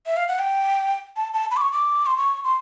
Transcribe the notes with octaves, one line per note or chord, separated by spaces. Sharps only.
E5
F5
F#5
G5
A5
A5
B5
D6
C#6
D6
C6
C#6
C6